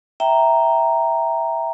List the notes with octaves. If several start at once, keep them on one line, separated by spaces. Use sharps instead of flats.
E5 G5 A#5